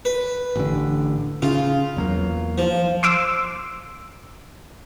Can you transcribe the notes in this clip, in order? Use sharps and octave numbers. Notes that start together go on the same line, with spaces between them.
B4
A1 D3
C#3 F4
E2 F#3 A#3
F3
C6 D6 E6